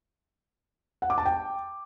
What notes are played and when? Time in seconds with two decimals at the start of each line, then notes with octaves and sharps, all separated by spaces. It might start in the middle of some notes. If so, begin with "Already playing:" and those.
1.02 F#5
1.10 D6
1.18 A5
1.26 G5